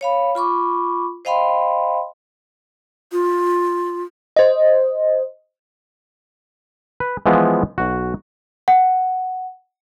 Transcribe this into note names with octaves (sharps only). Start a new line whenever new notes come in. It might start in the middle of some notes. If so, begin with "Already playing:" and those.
C#5 F5 B5
F4 B5 C#6 D6
C5 D#5 F5 G5 B5 C6
F4
C5 D#5
B4
E3 F3 G#3 B3
B1 F#4
F#5